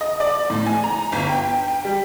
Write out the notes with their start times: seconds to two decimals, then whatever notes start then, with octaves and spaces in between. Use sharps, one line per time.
0.01 D#5
0.20 D5
0.50 A2
0.66 G#5
0.84 A#5
1.12 G1
1.29 G5
1.68 G5
1.85 G3